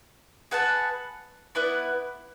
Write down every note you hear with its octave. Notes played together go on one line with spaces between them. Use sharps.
G#4 B4 F#5 A5
B3 E4 B4 D5